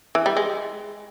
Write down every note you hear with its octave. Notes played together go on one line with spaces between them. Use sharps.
E3
G3
G#3